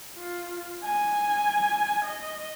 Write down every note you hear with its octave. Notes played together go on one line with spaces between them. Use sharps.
F4
G#5
D#5